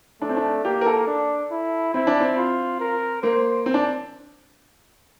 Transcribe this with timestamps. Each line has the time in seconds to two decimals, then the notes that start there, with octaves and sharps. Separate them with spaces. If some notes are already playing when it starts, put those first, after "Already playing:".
0.21 A3 D4
0.29 C4
0.37 D4
0.65 A#3 G4
0.81 A#4
0.86 A4
1.07 D4
1.51 E4
1.94 C4 E4
2.07 D4
2.20 C4
2.38 F4
2.80 A#4
3.23 A#3 C5
3.66 C4
3.74 D4